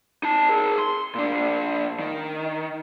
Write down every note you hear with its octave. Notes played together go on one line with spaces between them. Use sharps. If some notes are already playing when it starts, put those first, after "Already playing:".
D#4 A5
G#4 A#4
C6
A#2 D4
D#3